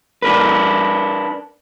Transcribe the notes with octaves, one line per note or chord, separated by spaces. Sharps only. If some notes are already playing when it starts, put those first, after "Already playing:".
D4 A#4 B4